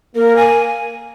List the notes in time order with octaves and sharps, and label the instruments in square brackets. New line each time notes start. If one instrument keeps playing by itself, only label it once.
[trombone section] A#3 [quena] A#4
[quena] G#5